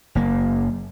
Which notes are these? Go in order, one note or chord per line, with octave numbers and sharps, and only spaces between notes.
F#1 A#3